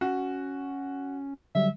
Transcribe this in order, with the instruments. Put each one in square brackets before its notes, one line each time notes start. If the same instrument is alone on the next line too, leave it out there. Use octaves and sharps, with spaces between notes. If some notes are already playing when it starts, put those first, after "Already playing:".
[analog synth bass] C#4 [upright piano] F#4
[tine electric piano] D3 F#3 G3 [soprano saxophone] E5